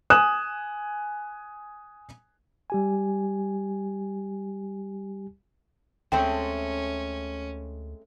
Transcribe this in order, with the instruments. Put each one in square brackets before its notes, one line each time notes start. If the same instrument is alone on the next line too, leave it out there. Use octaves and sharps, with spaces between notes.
[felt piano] G#5 D#6 F#6 E7
[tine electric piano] G3 G4 G#5
[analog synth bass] D2 [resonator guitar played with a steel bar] G#3 A3 C4 [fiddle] C#4 [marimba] G5